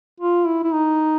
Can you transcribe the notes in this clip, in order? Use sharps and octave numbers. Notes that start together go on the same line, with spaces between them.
F4
E4
E4
D#4